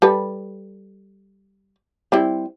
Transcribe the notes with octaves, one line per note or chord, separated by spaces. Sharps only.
G3 A4 B4
G3 C4 E4